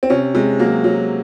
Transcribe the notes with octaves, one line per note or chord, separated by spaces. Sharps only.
C4
C3 C#4
C3 G#3
F#3 A#3
F#3